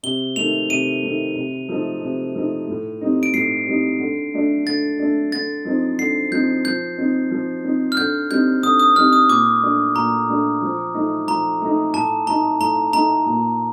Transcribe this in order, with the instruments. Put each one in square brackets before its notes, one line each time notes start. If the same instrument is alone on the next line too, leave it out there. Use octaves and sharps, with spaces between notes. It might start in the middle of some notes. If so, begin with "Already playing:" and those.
[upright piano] C3 [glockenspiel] G7
[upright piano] D#3 A3 [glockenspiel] F7
[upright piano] C3 [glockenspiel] D#7
[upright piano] D#3 A3
C3
F3 A3 D#4
C3
F3 A3 D#4
A2
G3 C4 D#4
[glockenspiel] D7
[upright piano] A2 [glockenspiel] C7
[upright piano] G3 C4 D#4
D3
A3 D4
[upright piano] D3 [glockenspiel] A6
[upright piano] A3 D4
[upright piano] D3 [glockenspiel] A6
[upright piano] F3 C4 D#4
[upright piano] D3 [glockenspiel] C7
[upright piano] F3 C4 D#4 [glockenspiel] G6
[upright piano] F3 [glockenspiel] G6
[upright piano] C4 D#4
F3
C4 D#4
[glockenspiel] F6
[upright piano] D3 [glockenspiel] G6
[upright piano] G3 C4 D#4 [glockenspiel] G6
[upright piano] D3 [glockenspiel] D#6
[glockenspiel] D#6
[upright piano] G3 C4 D#4 [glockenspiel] F6
[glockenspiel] D#6
[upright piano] A#2 [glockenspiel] D6
[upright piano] A3 D4
[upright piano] A#2 [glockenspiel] A#5
[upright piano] A3 D4
F3
A3 D#4
[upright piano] F3 [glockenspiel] A#5
[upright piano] A3 D#4
[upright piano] A2 [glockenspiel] A5
[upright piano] A3 D#4 [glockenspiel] A#5
[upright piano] A2 [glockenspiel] A#5
[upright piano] A3 D#4 [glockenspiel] A#5
[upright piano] A#2